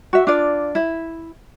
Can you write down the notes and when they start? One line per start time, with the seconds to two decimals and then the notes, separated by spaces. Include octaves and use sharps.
0.13 F#4 E5
0.27 D4 F4 D5
0.75 E4